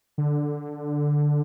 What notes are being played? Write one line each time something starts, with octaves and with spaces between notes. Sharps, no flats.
D3